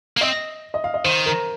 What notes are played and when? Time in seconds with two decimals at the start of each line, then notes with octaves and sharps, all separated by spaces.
0.17 A#3
0.21 C4 D#5
0.74 D#5
0.84 F5
0.94 D#5
1.04 D#3 C5
1.26 A#4